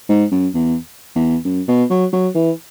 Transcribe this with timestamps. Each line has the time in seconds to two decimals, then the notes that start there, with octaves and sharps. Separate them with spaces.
0.09 G#2
0.32 F#2
0.54 E2
1.16 E2
1.45 F#2
1.68 B2
1.90 F#3
2.13 F#3
2.35 E3